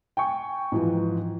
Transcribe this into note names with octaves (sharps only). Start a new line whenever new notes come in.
G5 G#5 C#6
G#2 E3 F3